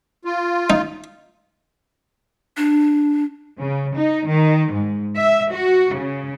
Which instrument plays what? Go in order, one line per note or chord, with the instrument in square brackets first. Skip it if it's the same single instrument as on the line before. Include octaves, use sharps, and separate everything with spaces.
[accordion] F4
[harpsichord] D#4
[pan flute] D4
[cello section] C#3
D#4
D#3
G#2
E5
F#4
C#3